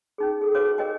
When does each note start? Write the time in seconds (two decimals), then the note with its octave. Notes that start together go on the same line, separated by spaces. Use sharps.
0.18 C#4 D#4 G#4
0.41 G#4 A4
0.55 F#4 G#4 B4 C#5 F5 D6
0.78 G4 A#4 C#5 D#5 G5 G#5